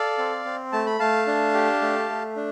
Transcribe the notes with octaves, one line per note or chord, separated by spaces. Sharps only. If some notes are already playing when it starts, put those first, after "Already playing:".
Already playing: A4 D5 F5
C4
C4
A3 A5
B5
A3 F5 A5
D4
G4
A3
A3
D4